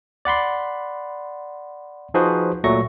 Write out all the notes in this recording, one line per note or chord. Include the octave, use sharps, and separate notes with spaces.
D5 F#5 B5 C6
F3 D#4 F#4 G#4 B4 C5
A#2 F#3 A3 C#6 A#6